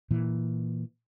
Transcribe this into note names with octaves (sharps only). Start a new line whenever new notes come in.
A#2 E3